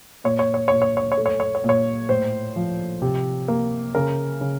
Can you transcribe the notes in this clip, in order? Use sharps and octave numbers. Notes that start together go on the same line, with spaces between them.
A#2 C#5
C#5
C#5
C#5
A#2
C#5
C#5
C#5
A3
C#5
C#5
C#5
A#2
C#5
A2 C5
F3
C3
A#3
C#3 A#4
C#3